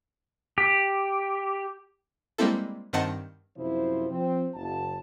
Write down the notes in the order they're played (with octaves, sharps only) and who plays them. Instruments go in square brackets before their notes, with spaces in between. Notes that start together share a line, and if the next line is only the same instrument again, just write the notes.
[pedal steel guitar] G4
[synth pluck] G3 G#3 A#3 C4 E4 A4
G2 D#3 C4 D#5 F#5 A5
[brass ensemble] F#2 C3 F3 E4 C5
F3 C4
F#1 A5